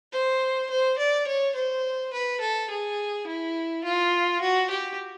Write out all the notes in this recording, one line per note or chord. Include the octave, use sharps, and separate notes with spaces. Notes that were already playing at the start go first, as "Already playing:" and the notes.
C5
C5
D5
C#5
C5
B4
A4
G#4
E4
F4
F#4
G4